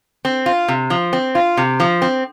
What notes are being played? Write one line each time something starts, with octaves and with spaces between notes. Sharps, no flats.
C4
F4
C3
F3
C4
F4
C3
F3
C4